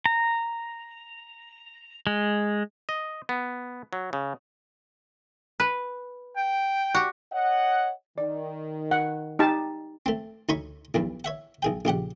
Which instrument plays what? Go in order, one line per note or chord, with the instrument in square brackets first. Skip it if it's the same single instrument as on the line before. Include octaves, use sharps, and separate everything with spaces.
[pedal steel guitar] A#5
G#3
[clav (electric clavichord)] D#5
B3
F#3
C#3
[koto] B4
[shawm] G5
[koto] F#4 G4
[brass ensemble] C#5 D#5 F#5
[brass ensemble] D#3 [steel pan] D5
[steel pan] F#5
D#4 G4 A5
[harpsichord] A3 C4
D2 D#4 C#5 B5 C#6
B1 E2 G2
C#5 E5 F#5
B1 G#4 G5
A#1 C#3 G4 F#5